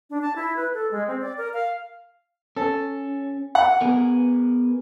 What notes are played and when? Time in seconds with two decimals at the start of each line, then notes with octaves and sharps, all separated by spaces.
0.10 D4
0.22 A5
0.36 E4
0.56 B4
0.74 A4
0.91 G#3
1.08 C4
1.21 D5
1.38 A#4
1.53 F5
2.56 C#4 A4
3.55 F#5
3.81 B3 G#4 A#4